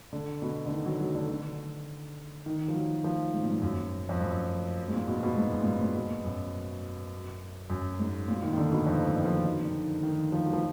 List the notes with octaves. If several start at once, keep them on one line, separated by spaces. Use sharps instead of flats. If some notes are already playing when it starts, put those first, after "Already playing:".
D3
B2
D3
D#3
F#3
F#3
D3
D3
D#3
F3
F#3
F3
G#2
A#2
G#2
F#2
F2
F#2
G#2
A#2
B2
B2
G#2
F#2
A#2
G#2
A#2
B2
F#2
F#2
G#2
A#2
D#3
D#3
D3
B2
F2
F#2
D#3
F3
D#3
D3
D#3
D#3
F3
F#3
F3